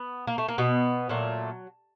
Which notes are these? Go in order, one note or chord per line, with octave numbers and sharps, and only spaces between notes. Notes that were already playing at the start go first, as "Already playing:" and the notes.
Already playing: B3
A#3
A3
A#3
B2 B3
A#2 F#3 A3